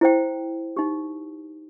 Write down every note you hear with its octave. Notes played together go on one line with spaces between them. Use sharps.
E4 C5 G5
D#4 G4